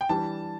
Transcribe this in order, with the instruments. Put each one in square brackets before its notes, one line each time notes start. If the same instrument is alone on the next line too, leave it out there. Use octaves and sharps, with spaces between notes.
[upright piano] G5
[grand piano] E3 G3 D4 G4 [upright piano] A5